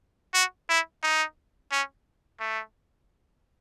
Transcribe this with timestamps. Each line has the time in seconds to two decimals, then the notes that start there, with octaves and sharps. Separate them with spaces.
0.34 F#4
0.69 E4
1.03 D#4
1.72 C#4
2.40 A3